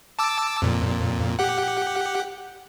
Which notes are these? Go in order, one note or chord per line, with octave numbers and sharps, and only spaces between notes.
A5 D6 E6
F2 A#2
G4 F#5